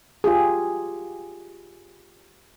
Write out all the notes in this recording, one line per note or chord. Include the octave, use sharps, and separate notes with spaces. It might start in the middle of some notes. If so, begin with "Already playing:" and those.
F4 G4 G#4